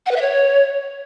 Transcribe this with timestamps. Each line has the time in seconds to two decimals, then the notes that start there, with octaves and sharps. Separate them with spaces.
0.06 F#5
0.11 B4
0.16 E5
0.21 C#5